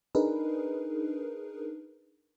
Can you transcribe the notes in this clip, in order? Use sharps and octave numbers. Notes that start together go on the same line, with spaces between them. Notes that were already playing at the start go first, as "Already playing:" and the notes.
D4 D#4 G#4 A#4 B4